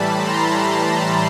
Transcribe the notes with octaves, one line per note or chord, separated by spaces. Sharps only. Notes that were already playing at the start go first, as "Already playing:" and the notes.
Already playing: A2 E3 G3 A5 B5
A#5 C6